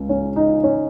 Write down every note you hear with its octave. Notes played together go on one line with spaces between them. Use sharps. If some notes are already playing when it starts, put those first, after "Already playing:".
Already playing: C#2
C#4
D#4
C#4